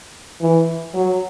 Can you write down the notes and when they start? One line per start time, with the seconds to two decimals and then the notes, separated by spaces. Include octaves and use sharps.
0.41 E3
0.94 F#3